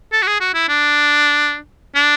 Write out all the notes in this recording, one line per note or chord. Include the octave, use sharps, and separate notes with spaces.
A4
F#4
G#4
F#4
E4
D4
D4